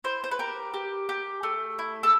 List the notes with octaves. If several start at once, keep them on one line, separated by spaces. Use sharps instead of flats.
E4 C5
C5
B4
G4 A#4
G4
G4
A3
E4
A4